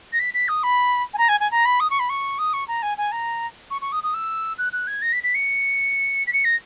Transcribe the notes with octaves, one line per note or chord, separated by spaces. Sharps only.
A#6
B6
B6
D#6
B5
G#5
A#5
G#5
G#5
A#5
B5
D#6
C#6
B5
C#6
D#6
C#6
A#5
G#5
G#5
A#5
C#6
C#6
D#6
D#6
E6
F#6
F#6
G#6
A#6
B6
B6
C#7
B6
C#7
A#6